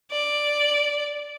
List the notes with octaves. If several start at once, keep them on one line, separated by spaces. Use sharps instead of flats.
D5